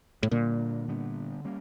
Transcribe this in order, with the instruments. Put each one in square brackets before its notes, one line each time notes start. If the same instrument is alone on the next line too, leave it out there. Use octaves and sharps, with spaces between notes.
[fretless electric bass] A2
[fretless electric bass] A#2 [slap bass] D3 G3 A#3 D4
[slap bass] D3 G3 B3 D4
G3 A#3 C#4